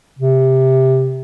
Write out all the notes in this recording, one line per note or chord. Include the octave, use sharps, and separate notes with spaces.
C3